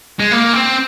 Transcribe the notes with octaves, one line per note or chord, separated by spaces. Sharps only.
G#3
A#3
C4